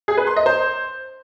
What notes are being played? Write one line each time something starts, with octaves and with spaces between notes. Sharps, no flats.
G#4
B4
C6
D#5
C5